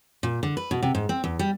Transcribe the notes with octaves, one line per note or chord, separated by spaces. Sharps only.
A#2
D3
B4
B2
C3
G#2
C4
E2
G3